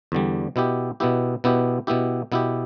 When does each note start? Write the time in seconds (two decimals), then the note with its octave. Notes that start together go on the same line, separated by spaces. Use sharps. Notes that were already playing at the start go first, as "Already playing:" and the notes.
0.12 E2 D3 G3
0.56 B2 B3 E4 G4
1.00 B2 B3 E4 G4
1.44 B2 B3 E4 G4
1.87 B2 B3 E4 G4
2.32 B2 B3 E4 G4